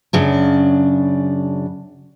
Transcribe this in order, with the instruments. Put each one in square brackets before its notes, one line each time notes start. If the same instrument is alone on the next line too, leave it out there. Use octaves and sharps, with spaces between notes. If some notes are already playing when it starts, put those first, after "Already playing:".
[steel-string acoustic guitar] F#2 C#3 D4